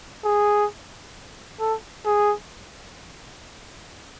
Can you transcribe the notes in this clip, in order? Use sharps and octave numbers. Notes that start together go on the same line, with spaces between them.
G#4
A4
G#4